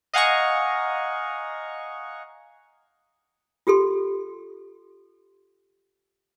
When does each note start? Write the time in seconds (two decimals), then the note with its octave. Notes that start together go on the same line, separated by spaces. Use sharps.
0.14 D#5 F5 F#5 G#5 A#5 C#6
3.67 F4 G4 A4 C6